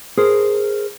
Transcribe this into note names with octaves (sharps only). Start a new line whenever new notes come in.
G#4 A#4 C5